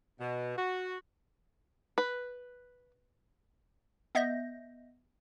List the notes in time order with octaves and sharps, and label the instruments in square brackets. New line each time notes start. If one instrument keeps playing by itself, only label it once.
[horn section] B2
F#4
[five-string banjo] B4
[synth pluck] B3 D#5 E5 G6 A#6